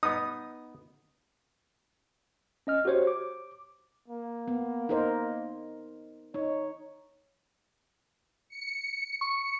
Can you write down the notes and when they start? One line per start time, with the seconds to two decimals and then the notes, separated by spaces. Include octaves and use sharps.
0.03 B3 D#4 D#6
2.67 C#4 D#5 F6
2.85 F#4 G4 C5 C#5
3.07 D6
4.08 A#3
4.48 B3
4.89 D#4 A#4 C5
6.34 D#4 C#5
8.49 C#7
9.21 C#6